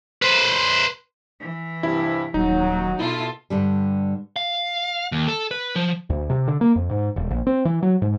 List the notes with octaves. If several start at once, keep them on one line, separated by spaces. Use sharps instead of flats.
B4 C5
E3
G2 C3 E4
D#1 F#3 D#4
B2 E4 F4 A4
G2 D3 G3
F5
D#2
A4
B4
F3
D2
C3
D3
A#3
F2
G#2
E1
A#1
C4
E3
F#3
G#2